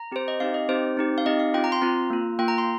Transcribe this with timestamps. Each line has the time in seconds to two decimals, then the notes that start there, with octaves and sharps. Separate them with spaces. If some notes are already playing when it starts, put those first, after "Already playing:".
Already playing: A#5
0.12 C4 G4 C5
0.28 D#5
0.40 C4 D#4 G4 F5
0.54 D#5
0.69 C4 D#4 G4 C5
0.97 C4 D#4 G4
1.18 F5
1.25 C4 D#4 G4 D#5
1.39 F5
1.54 C4 F4 G5
1.64 A#5
1.72 C6
1.82 C4 F4 A#5
2.10 A#3 F4
2.39 A#3 F4 G5
2.48 A#5
2.58 C6